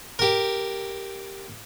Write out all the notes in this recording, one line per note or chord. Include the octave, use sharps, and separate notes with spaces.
G4 A#4